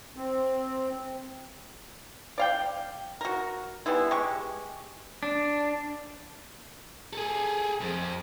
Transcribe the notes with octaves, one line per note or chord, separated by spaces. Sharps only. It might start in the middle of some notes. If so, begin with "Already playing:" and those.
C4
D5 F5 G5
F#4 A#4
G3 G#3 B3 E4
G#3 G4 C#6
D4
G#4 A4
F2